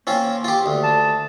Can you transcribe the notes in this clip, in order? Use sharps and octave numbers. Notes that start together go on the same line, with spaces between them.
A#3 C4 C#4 F4
F4 G4
D2
A5